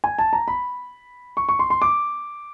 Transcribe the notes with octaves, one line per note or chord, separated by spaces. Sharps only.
G#5
A5
A#5
B5
C#6
C#6
C6
C6
D6